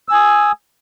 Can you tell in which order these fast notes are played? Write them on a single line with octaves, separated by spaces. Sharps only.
E6 G#5 D#6